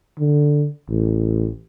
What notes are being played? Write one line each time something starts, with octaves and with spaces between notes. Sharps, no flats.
D3
A1